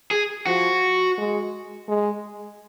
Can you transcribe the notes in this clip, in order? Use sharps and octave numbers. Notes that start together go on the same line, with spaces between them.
G#4
F3 F#4
G#3
G#3